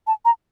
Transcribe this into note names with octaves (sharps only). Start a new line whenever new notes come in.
A5
A#5